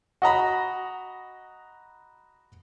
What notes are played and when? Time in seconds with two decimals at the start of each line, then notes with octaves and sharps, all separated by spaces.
0.22 F#4 D#5 A#5 B5